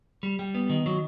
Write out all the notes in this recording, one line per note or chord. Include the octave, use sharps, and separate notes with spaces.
G3
G3
B3
D#3
F#3